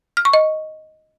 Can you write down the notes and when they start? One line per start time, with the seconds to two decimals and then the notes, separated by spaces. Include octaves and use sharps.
0.17 F6
0.25 C#6
0.33 D#5